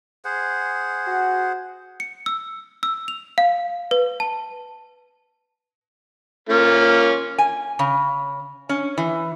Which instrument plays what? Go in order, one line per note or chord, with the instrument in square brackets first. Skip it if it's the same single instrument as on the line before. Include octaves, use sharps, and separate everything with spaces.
[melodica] G#4 C5 F#5
[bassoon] F#4
[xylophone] C#7
E6
E6
F7
F5
B4
A5
[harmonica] A#3 C#4 F4
[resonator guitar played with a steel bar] G#5
C#3
C#4
E3